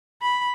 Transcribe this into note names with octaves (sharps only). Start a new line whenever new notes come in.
B5